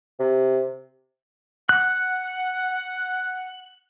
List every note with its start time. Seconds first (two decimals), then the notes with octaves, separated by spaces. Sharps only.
0.20 C3
1.69 F#5 F#6